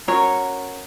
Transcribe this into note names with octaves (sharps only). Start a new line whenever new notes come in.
C#4 F#4 A#4 C#5